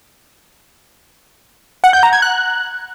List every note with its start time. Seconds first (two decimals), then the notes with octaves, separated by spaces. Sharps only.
1.84 F#5
1.93 G6
2.03 A#5
2.13 G#6
2.22 F#6